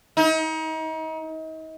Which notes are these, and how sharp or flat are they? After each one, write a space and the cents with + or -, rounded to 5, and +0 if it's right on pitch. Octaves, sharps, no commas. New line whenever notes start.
D#4 +35